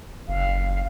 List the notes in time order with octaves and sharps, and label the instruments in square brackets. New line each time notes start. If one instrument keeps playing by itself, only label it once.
[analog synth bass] F#1 [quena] F5